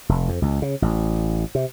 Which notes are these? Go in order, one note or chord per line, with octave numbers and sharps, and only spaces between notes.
F1
F2
C#2
C#3
A1
C3